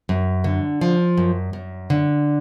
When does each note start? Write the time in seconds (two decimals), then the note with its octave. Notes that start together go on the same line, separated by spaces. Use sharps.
0.09 F#2
0.44 D3
0.81 F3
1.17 F#2
1.53 F#2
1.90 D3